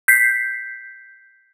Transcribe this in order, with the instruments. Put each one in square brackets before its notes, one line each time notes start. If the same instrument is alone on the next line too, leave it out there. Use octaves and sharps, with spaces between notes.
[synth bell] G6 B6 C7